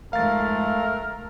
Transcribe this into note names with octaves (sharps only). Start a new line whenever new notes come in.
F2 G#2 A3 A#4 F5 A6